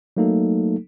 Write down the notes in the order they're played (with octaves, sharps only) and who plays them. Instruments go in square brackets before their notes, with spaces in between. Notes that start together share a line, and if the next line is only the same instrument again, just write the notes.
[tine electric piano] F#3 A3 A#3 D#4 A4